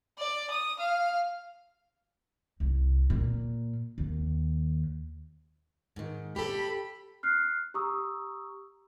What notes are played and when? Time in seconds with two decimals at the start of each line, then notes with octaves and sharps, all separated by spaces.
0.18 D5
0.50 D#6
0.79 F5
2.60 C2
3.10 A#2
3.98 D#2
5.96 G#2 D#3
6.36 G4 A4 B5
7.23 F6 F#6 C7
7.74 G4 A#5 C#6 D#6 E6